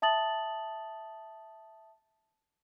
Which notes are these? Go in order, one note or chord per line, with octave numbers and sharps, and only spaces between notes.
E5 A5 D#6 A6 F#7